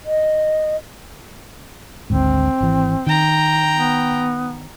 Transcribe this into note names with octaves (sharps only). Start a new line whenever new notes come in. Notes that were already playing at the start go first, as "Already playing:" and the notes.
D#5
G#1 D2 G#2 C4
G#1 E3
D#3 G5 A#5
B3